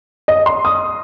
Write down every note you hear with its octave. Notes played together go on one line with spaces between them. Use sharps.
D#5
C6
D#6